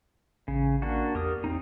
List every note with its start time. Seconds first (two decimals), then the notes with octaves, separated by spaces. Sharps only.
0.48 A1 C#3
0.82 A#3 D4 F#4
1.15 E2 G4 A#4 D#6
1.44 E2 C4 D#4